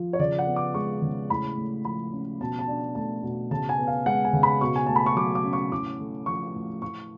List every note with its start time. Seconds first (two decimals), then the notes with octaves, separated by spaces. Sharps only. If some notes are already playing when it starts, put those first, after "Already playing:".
Already playing: F3
0.13 C#5
0.19 C#3 D5
0.39 F#5
0.47 B3
0.56 D6
0.74 G#3 C#6
1.02 C#3
1.30 A2 B5
1.57 A3
1.85 F3 B5
2.13 C#4
2.40 B2 A5
2.59 A5
2.67 D4
2.95 A3 A5
3.23 B2
3.51 C#3 A5
3.69 G#5
3.79 B3
3.87 F5
4.06 G#3 F#5
4.25 G#5
4.33 C#3
4.43 B5
4.61 B2 C#6
4.76 G#5
4.86 A3 A5
4.96 B5
5.06 C#6
5.16 F#3 D6
5.35 D6
5.44 C#4
5.53 C#6
5.72 A2 D6
5.99 A3
6.26 F3 C#6
6.55 A2
6.82 A2 C#6